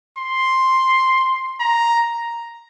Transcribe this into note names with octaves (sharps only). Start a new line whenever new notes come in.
C6
A#5